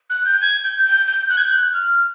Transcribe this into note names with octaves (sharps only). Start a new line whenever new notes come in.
F#6
G6
G#6
G6
G6
G6
F#6
G#6
G6
F#6
F6